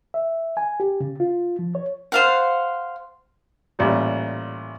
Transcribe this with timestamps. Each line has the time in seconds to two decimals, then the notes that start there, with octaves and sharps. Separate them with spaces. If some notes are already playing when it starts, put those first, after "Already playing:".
0.14 E5
0.57 G#5
0.80 G4
1.00 C#3
1.20 F4
1.59 F3
1.75 C#5
2.12 C5 F5 F#5
3.79 A1 A#2 G3